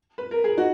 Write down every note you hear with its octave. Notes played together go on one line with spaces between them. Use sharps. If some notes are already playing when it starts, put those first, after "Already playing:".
B4
A#4
G#4
D#4 F#4